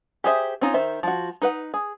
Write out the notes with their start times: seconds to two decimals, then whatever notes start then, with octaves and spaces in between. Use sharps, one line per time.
0.24 G4 G#4 C5 E5
0.61 C4 C#4 D#4 F4
0.74 D#3 C5 E5
1.03 F3 F#4
1.42 D#4 B4 F#5
1.74 G#4